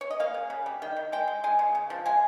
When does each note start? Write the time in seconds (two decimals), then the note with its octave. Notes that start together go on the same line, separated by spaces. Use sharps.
0.01 C#5
0.11 D#5
0.20 A#3 F5
0.34 C#3
0.50 C#3
0.66 G3
0.82 D#3 G5
0.96 D#3
1.12 G#3 G5
1.28 G#3
1.44 G#3 G#5
1.59 C#3
1.75 C#3
1.90 F3
2.06 G#3 G#5